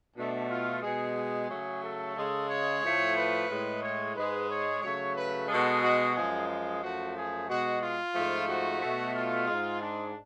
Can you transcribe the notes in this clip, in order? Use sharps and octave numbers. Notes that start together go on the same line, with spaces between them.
B2 A3 D4
F4
B2 G#3 G#4
G#4
C#3 F#3 A3
A4
C#3 G#3
C#5
A2 F3 A3
B4
A2 G#3
C#5
G#2 G#3 B4
C#5
C#3 F#3 A3 C#5
B4
B2 G#3 A4
F#4
F#2 F3 G#3 G#4
G#4
F#2 F3 A3 F#4
G#4
B2 G#3 F#4
F4
G#2 F3 A3
F#4
B2 A3
F4
G#2 G#3
D4